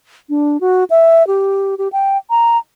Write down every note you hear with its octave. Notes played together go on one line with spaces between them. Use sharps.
D4
F#4
E5
G4
G4
G5
A#5